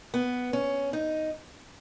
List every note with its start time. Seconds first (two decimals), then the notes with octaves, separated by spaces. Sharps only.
0.14 B3
0.53 C#4
0.93 D#4